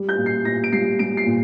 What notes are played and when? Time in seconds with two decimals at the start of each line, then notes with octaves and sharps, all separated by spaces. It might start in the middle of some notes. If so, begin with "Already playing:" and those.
Already playing: G3
0.09 G6
0.18 A#2
0.26 C7
0.45 A#2 A#6
0.64 D7
0.73 G3 C7
0.99 G3 D7
1.17 C7
1.26 A#2